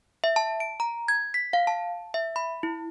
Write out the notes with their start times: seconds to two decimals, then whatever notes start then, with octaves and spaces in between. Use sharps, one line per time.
0.24 E5
0.36 A5
0.60 D7
0.80 A#5
1.08 G#6
1.34 B6
1.53 F5
1.67 A5
2.14 E5
2.36 B5
2.63 E4